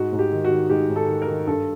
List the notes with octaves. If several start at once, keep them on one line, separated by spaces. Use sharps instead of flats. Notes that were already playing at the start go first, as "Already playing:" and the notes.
Already playing: G#2 F#4
G#2
G4
D#3
F#4
D#3
G#2 G4
G#2
A4
D#3
A#4
D#3
G2 A4